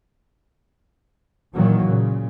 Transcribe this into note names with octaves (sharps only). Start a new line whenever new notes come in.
A#2 D#3 E3 F#3 A#3
A#2 C#3